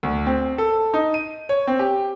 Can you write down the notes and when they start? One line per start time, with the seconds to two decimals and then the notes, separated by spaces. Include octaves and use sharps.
0.03 D2
0.26 C4
0.58 A4
0.94 D#4
1.14 D#7
1.49 C#5
1.67 C4
1.79 G4